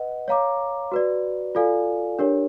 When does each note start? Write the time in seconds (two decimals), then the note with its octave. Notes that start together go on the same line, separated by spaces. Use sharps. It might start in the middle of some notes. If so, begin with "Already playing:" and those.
Already playing: B4 D#5 F#5
0.28 C#5 F5 A#5 D6
0.92 F#4 B4 D5
1.55 F4 A4 D5 F5 G#5
2.19 D4 G4 A#4 C#5